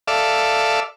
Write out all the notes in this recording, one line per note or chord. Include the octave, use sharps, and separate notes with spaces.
A4 D5 E5 F5